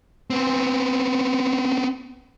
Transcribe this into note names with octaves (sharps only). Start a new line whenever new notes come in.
B3 C4